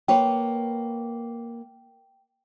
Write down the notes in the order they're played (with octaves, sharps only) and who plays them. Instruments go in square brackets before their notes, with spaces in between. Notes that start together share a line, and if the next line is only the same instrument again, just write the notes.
[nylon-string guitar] A#3 B4 C#5 [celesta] G5